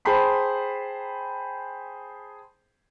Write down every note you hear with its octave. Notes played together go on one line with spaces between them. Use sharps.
G#4 C5 G5 A5 B5 C6